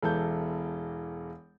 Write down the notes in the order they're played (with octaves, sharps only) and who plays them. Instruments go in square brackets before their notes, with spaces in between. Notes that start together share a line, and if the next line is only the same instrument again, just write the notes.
[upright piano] E1 E3 A4 G6